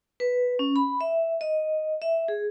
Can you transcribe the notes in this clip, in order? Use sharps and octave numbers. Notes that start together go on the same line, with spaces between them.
B4
C#4
B5
E5
D#5
E5
G#4